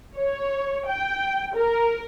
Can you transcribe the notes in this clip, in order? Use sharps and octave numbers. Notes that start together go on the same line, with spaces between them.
C#5
G5
A#4